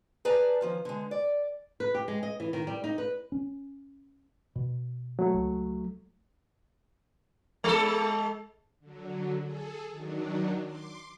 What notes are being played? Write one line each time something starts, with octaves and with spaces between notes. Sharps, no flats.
G#4 B4 D5 A5 A#5
D#3 F3 C#4
D3 G#3
D5
B4
G4
G#3
D#5
E3
D#3
G3
D#4
B4
C#4
B2
F#3 A3
C#2
G#3 A4
D3 F#3
G#4 A4
D#3 F#3 D4
C6 D6